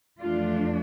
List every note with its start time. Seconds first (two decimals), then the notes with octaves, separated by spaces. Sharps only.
0.20 F2 E3 A3 D4 F4